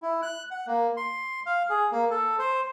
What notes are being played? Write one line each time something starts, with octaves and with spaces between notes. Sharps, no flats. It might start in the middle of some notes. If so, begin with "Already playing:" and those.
E4
F#6
F#5
A#3
C6
F5
G#4
A#3
A4
C5